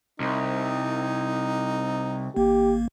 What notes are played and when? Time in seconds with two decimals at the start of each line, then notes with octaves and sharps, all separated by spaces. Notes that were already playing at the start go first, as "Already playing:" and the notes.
0.20 C2 D#4
2.36 G#1 A#3 G4